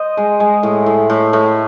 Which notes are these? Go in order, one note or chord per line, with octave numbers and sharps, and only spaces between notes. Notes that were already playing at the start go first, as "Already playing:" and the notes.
Already playing: C5 D#5
G#3
G#3
A2
A2
A2
A2